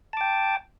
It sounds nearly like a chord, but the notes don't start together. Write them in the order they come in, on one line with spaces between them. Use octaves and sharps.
A5 D6 G5